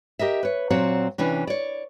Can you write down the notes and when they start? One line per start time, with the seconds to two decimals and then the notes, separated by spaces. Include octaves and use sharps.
0.19 G4 A#4 D#5 E5
0.43 B4 C#5
0.70 A#2 F#3 C4 C#5 F#5
1.18 C3 E3 C#4 D4
1.47 C#5 D5